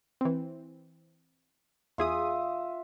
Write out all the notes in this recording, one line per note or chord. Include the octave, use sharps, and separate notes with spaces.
E3 C4
E2 F4 G#4 E5 D#6